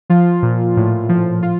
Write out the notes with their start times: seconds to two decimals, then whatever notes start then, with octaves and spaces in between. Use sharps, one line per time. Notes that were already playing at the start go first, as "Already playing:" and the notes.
0.10 F3 F4
0.43 A#2
0.77 A2
1.09 F3
1.43 F3 F4